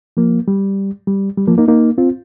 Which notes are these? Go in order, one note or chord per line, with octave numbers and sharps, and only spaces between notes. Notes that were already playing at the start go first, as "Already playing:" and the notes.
F3 A#3
G3
G3
G3
F3 A#3
A#3 D#4
A#3 D#4
C4 F4